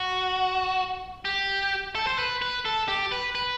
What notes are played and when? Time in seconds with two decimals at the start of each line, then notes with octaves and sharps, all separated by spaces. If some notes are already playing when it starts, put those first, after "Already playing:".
Already playing: F#4
1.25 G4
1.95 A4
2.07 C5
2.18 B4
2.42 B4
2.65 A4
2.88 G4
3.12 B4
3.35 B4